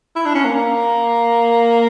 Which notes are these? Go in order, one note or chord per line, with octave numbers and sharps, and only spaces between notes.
E4
D4
C#4
A#3